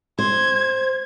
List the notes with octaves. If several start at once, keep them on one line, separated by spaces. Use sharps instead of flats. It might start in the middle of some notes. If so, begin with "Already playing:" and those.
C5 G#6